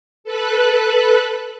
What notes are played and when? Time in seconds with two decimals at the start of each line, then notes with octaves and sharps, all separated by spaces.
0.24 A4 B4 F#6